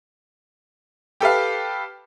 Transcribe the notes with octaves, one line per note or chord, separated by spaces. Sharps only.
G4 A4 B4 F5